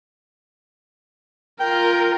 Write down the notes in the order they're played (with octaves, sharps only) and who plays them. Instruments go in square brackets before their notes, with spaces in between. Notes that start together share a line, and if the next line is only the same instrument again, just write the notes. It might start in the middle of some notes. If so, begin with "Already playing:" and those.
[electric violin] F4 A#4 [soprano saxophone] G5